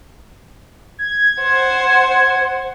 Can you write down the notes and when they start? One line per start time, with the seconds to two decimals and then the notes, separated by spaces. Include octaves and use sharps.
0.99 G#6
1.40 C5 F#5